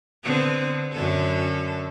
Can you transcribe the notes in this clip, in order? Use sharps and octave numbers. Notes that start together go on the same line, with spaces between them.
D3 B3 C4
F#2 D3 A4